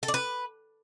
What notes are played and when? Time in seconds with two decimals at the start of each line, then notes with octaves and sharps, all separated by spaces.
0.03 A4
0.08 D5
0.14 B4